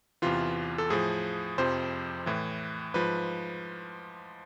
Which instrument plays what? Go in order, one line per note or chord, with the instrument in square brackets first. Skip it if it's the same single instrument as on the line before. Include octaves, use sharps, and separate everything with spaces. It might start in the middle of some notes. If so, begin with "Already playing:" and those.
[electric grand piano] E2 C3 E3 F4
A4
A2 F3 G#4
F2 C3 F3 C5
A2 E3
G#2 F3 B4